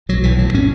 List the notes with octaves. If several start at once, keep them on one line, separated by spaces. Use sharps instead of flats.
B1 F#3
B1 E3
A2 F#3
A2 C#4